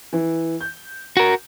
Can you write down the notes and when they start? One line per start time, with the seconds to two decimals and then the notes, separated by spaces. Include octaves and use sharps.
0.13 E3
0.61 G6
1.17 F#4 A#4